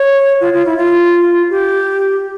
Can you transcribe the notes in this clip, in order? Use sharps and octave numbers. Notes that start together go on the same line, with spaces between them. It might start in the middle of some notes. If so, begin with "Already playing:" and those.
Already playing: C#5
F4
F4
E4
F4
G4